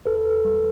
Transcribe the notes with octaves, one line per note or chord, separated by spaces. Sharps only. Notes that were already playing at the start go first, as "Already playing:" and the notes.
E2 A4 B4
G3